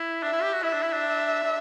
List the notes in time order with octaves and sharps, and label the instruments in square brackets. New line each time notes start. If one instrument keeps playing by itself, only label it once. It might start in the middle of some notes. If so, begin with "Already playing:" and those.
Already playing: [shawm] E4
[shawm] D4 [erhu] E5
[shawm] E4
G4
F#4
[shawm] E4 [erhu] E5
[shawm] D4
E4
D4
D4